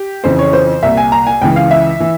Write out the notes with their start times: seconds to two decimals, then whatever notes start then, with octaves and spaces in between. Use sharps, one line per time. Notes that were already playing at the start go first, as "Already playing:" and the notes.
Already playing: G4
0.24 F2 C#3 E3 C5
0.39 C#5
0.53 C5
0.83 C2 A#2 E5
0.97 G#5
1.12 A#5
1.27 G#5
1.41 C#2 C#3 E3 G5
1.56 F5
1.71 E5
2.00 E3